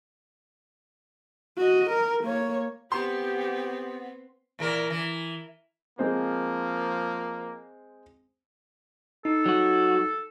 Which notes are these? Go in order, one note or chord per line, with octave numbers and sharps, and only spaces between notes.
F#4 D#5
A#4
A#3 C#5
B3 C4 G4 B4 C6
A#2 E3 A#4
E3
F3 G#3 A#3 C4 C5
D#4 A4
F#3 F#4